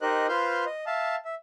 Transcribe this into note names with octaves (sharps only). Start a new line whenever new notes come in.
D#4 G4 A#4 C5 D#5 F#6
F4 B4 C5 C6 F6 G6
D#5
E5 F5 A5
E5